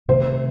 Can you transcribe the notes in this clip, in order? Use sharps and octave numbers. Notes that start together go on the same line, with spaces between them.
C2 C3 D#3 A3 C5